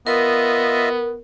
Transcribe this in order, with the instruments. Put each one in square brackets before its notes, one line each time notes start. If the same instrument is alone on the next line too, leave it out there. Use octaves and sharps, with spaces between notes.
[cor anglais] B3 [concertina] F4 D#5 E5 [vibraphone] A#4